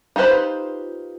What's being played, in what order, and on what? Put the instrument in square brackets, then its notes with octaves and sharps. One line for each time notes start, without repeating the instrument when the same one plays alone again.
[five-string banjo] D#4 F4 G4 B4 C5